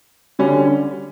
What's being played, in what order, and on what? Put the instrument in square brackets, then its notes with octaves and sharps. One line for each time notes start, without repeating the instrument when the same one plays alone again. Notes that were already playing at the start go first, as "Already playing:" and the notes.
[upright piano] D3 G3 C#4